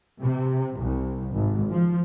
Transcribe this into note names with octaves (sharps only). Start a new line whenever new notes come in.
C3
C2
G#1
F3